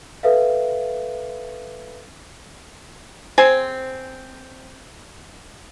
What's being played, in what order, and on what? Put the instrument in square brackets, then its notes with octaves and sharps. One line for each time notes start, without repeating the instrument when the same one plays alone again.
[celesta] A4 B4 E5 F5
[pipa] C4 G#4 C5 G#5